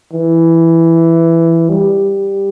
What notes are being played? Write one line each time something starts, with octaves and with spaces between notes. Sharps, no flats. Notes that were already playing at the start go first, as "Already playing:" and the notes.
E3
G3